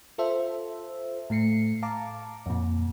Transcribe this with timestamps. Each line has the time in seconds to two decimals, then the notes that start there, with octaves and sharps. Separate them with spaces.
0.18 F4 A4 C5 E5
1.30 A2 A3 C7 C#7
1.82 F5 A5 A#5 D6
2.46 F2 A#2